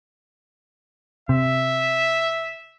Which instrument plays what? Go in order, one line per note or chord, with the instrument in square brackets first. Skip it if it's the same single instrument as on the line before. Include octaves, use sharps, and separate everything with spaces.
[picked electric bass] C3 [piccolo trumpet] E5